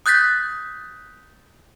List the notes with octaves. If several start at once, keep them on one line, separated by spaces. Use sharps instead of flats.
D#6 F#6 G6 A6 B6